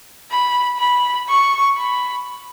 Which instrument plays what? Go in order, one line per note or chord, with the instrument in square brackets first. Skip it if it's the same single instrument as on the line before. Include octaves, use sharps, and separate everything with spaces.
[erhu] B5
B5
C#6
B5